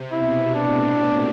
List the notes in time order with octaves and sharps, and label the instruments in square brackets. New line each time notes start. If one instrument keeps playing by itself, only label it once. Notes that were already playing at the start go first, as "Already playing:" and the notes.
Already playing: [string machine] C3
[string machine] B2 [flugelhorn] E4
[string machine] A2 [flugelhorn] D4
[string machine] A#2